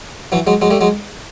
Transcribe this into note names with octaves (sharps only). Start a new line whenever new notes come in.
E3 F#3
F#3 G#3
F#3 G#3
G3 A3
F#3 G#3